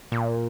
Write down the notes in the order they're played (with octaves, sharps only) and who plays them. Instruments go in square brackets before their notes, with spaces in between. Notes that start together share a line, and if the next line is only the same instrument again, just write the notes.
[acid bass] A#2